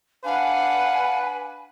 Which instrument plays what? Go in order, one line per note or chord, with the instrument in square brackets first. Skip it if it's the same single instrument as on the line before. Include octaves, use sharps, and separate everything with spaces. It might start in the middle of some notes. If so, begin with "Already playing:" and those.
[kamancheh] D4 F#5 [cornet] B4 [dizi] F5 [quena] G#5